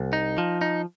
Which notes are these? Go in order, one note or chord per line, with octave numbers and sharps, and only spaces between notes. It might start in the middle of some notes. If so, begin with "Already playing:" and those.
Already playing: C2
D#4
F3
D#4